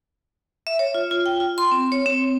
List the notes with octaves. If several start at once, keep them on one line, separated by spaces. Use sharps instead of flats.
E5
C#5
F4
F4
G5
F4
C6
C4
C#5
C4